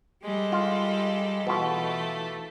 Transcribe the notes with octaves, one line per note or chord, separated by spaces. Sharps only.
G3 G#3 A4
F4
B2 E3 A3 F4